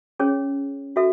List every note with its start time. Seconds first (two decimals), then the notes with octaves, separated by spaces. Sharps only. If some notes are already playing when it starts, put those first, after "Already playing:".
0.19 C#4 G#4 C#5
0.96 F#4 A4 E5